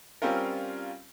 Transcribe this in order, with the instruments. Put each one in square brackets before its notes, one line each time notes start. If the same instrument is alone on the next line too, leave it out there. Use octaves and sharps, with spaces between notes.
[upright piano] G3 C4 C#4 F4 A#4